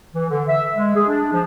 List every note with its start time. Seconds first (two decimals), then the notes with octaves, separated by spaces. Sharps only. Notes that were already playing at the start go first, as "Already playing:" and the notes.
0.14 E3
0.29 D3
0.48 E5
0.74 G#3
0.95 G#4
1.08 D4
1.32 F3